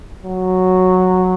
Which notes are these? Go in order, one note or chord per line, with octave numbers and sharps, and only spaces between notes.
F#3